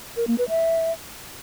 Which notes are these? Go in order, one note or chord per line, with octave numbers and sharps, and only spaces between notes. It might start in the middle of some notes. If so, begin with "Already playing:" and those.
A#4
A#3
B4
E5